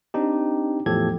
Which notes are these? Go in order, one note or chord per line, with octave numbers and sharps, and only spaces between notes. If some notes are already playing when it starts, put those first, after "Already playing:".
C4 D4 D#4 G4
E2 A2 F3 G4 A4 G#6